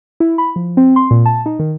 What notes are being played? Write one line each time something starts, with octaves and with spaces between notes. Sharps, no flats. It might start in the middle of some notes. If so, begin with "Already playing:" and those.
E4
B5
F3
C4
C6
A#2
A5
D#4
D#3